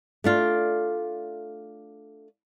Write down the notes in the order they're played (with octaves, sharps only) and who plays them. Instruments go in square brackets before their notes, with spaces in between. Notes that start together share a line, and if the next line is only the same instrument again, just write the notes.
[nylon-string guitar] A3 D4 F4